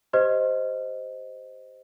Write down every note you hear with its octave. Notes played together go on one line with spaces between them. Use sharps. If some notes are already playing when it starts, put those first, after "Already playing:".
G4 C5 D#5